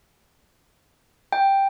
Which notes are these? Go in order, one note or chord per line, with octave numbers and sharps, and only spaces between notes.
G5